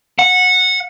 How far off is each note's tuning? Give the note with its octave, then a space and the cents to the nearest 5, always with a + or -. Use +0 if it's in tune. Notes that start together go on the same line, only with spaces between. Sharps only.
F#5 -15